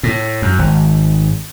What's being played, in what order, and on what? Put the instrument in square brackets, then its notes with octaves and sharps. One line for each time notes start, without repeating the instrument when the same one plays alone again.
[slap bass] A2
F#2
G#1